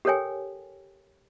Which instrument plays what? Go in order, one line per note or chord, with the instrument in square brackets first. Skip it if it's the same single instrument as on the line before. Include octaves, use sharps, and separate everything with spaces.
[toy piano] G4 A4 A#4 C#5 G5 G#5